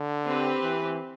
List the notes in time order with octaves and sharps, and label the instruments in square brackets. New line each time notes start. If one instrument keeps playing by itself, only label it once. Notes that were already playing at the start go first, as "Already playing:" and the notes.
Already playing: [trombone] D3
[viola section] C4 G4 B4
[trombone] E3